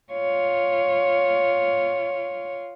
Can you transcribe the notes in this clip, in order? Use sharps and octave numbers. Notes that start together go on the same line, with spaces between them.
F4 C#5